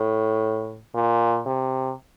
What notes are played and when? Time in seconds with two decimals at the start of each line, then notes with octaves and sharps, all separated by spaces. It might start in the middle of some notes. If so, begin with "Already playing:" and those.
Already playing: A2
0.95 A#2
1.46 C3